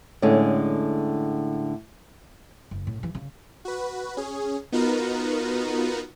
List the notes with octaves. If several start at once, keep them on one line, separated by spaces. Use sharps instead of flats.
A2 D3 G#3 C#4 G#4
F#1
A2
E3
C#3
F#4 B4
C#4 G#4
B3 D#4 F4 F#4 A#4 B4